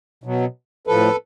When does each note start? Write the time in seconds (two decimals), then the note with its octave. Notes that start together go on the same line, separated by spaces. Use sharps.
0.24 B2 F#3
0.87 A2 F3 A4 B4